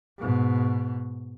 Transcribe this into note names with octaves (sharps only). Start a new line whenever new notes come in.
G#2 B2